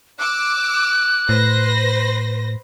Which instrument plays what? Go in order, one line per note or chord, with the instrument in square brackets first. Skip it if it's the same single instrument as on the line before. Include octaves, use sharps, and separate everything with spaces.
[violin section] D6 E6 [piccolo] F#6
[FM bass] A2 [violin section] B4 C5 A#6